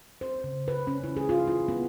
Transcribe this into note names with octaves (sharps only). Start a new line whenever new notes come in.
C5
C#3
B4
C#4
E4
G#4
F4
E4
B3